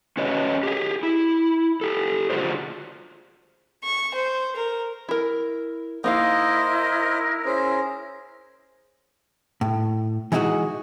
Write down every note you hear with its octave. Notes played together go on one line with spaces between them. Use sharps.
C#4 F#4 B4 C#5 D#5
G4 G#4
E4
G4 A4
D3 F4 F#4 G#4 C5
C#6
C5
A#4
E4 A#4
A#3 D#4 E4 A#4 C5 D#5 F5
C#4 G#4 C5
A2
E3 G#3 D#4 E4 F#4 G#4